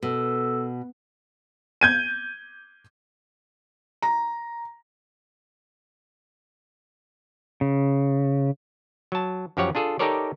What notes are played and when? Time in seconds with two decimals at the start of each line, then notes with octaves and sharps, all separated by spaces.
0.03 B2 A4
1.81 G6 G#6 D#7
4.02 A#5
7.61 C#3
9.12 F#3 A5
9.57 F#2 F3 G4 C#5 F#5
9.75 D4 F4 G#4 A4
9.99 D#4 G4 A4 A#4 C#5 D5